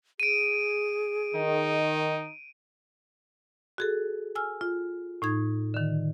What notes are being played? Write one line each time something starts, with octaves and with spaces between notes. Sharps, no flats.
G#4 D7 D#7
D#3 D#4
F#4 G#4 A4
G#5 E6 F6
F4
A2 D#4 G#6
D3 D#3